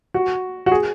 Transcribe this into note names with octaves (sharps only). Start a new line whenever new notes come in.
F#4
F#4
G#4